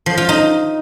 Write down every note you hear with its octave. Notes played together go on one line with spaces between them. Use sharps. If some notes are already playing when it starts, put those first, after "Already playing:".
F3
F4
D#4